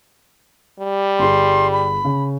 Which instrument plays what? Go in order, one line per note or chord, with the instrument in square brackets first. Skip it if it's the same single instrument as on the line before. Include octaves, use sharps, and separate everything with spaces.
[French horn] G3
[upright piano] G1 G#4 [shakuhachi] C6
[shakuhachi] B5
[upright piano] C#3